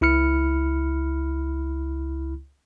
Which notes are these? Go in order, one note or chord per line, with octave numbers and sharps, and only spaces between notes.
C#2 E4 B5 F6 C#7